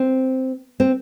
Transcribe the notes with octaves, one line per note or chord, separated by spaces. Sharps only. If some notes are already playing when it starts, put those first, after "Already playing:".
Already playing: C4
C4